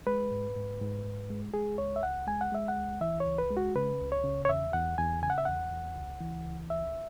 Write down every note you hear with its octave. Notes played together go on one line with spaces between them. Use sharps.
G#3 B4
G#2
G#2
G#2
G#2
G#3
G#3 G#4
C#2 C#5
E5
C#2 F#5
G#3 G#5
F#5
G#3 E5
F#5
C#2
E3 E5
C#5
C#2
B4
G#3
F#4
C#3 B4
C#2
C#5
C#3
C#5
E2 E5
E2 F#5
E2 G#5
C#3 G#5
F#5
E5
E2 F#5
E2
C#2
E3
C#2
C#2 E5